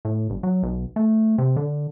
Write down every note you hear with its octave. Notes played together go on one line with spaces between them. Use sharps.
A2
G1
F#3
B1
A3
C3
D3